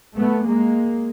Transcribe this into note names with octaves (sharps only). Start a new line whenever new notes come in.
A3 B3
G#3 A#3